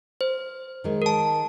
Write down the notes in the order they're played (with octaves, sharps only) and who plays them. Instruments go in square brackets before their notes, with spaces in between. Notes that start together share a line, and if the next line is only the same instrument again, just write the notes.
[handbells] C5
[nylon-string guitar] D#3 G#3
[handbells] A#4 A5